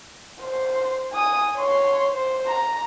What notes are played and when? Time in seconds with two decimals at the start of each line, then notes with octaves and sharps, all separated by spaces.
0.43 C5
1.11 G#5 D#6
1.56 C#5 C6
2.14 C5
2.47 A#5